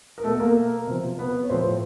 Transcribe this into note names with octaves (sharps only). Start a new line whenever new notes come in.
A#4
B2 A3 A4
A#3 A#4
C3 F3
B3 B4
C#5
A2 F3 C4 C5